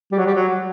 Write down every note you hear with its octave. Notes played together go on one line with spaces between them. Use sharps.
G3
F#3
G3
F#3
F#3